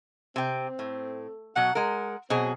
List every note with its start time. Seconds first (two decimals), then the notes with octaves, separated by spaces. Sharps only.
0.36 C3 C4 G5
0.79 A2
1.56 B2 F#3 F#5
1.75 G#3 A#4 F#5
2.30 B2 F#3 C4 G#4